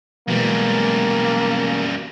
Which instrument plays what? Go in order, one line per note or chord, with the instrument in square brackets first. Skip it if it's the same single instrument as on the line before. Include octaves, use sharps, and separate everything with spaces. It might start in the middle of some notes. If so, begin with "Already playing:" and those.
[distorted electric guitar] F#2 G3 [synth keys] B2 E3 G#3 [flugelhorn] A#3